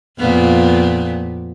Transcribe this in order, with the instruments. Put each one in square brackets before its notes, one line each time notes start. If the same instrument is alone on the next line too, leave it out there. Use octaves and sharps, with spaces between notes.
[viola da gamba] F2 A#2 B3